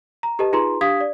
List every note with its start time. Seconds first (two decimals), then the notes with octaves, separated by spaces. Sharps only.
0.23 A#5
0.39 G4 A4 B4 D#5 A5
0.53 D#4 F4 G#4 B4 A#5 C6
0.81 D4 G4 F5 D#6 G#6 B6
1.01 D5